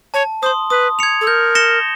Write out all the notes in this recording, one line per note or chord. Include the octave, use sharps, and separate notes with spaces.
C#5 A5
C5 C6 D#6
B4 D#6
G#6 C#7 F7
A4
A#4 G6
A#6 C#7 E7 G7